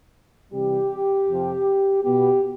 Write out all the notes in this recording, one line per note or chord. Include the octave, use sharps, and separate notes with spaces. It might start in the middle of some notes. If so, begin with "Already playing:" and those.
C3 E3 G3 G4
F2 C3 F3
B2 B3 G4